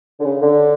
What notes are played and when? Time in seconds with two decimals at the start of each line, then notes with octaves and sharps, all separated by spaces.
0.20 D3
0.25 C#3
0.42 D3